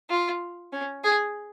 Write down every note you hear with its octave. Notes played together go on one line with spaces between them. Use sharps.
F4
C#4
G#4